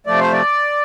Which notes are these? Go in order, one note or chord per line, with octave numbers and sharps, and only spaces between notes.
C3 F3 A3 D5
C5
D5